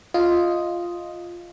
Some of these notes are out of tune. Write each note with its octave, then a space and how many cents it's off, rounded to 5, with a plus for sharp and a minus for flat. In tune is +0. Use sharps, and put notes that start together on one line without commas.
F4 +0 D#5 +0